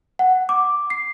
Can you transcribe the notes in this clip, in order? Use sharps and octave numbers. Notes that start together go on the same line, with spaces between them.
F#5
D6
C7